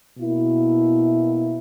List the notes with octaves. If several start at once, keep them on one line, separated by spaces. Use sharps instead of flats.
B2 A#3 E4